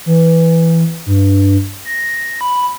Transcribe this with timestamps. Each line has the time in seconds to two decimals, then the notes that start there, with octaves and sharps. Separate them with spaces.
0.06 E3
1.06 G2
1.85 A#6
2.41 B5